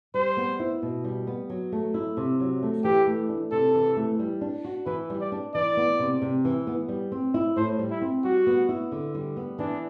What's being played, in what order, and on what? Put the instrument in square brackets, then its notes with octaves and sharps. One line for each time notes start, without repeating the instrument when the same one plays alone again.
[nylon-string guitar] G3 [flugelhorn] C5
[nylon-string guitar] B3
E4
B2
G3
B3
F#3
A3
E4
C3
F#3
A3
[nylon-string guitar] E3 [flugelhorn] G4
[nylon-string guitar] A3
D4
[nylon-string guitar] C3 [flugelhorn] A4
[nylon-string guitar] E3
A3
G3
D4
F#4
[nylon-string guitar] E3 [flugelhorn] B4
[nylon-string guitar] G3
[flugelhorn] D5
[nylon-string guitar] D4
[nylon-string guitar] E3 [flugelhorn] D5
[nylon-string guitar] B3
C3
C3
E3
B3
G3
C4
E4
[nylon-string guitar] A2 [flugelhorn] C5
[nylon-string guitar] G3
[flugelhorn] E4
[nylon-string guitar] C4
[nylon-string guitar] G3 [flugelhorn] F#4
[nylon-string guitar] B3
E4
D3
G3
B3
[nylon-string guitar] E3 [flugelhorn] D4